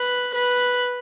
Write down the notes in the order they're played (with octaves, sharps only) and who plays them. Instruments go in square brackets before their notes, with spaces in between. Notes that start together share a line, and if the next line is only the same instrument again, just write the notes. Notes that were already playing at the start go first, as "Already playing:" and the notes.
Already playing: [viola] B4
B4